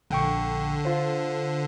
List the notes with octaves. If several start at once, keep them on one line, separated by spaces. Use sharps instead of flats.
A#1 D3 G5 C#6
F4 C5